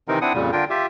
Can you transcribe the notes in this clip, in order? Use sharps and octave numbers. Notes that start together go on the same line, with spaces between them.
C3 D#3 E3 C4 D#4 A#4
C4 D4 E4 F#5 D#6
F2 A#2 C#3 G3
D3 D4 F4 A#4 G5
F4 G4 E5